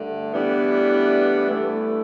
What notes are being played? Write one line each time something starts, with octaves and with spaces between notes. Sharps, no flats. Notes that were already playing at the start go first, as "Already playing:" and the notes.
Already playing: G2 D3 A3
A2 E3 G3 B3 D4
G2 E3 A3